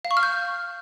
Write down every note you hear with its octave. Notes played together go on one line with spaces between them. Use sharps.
F5
C#6
F6
G6